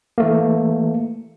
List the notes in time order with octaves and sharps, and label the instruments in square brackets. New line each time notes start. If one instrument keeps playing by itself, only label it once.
[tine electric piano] E3 A3 A#3